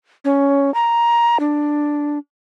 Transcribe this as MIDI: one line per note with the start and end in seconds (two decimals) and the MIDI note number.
0.25 0.73 61
0.74 1.37 82
1.40 2.18 62